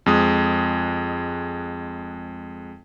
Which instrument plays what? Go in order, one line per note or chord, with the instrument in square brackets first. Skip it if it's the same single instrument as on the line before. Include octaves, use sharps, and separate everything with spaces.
[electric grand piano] F2 G#3 D#6